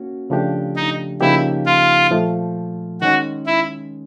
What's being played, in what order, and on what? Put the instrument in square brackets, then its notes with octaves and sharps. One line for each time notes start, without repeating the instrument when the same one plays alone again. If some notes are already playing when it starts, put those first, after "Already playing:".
Already playing: [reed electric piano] A#3 C#4 F#4
C#3 F3 A3 D4 G4
[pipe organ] D#4
[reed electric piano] C#3 F3 A#3 D#4 G4 [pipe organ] E4
[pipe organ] F4
[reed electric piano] A#2 F3 A3
[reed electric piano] D#3 G#3 C#4 [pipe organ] F#4
[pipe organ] E4